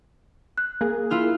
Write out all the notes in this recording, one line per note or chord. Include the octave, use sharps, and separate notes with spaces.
F#6
A#3 G#4
E4 F4 F6